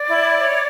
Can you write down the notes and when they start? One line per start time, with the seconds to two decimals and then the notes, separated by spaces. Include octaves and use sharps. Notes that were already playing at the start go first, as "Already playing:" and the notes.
Already playing: D5
0.08 E4
0.35 C#5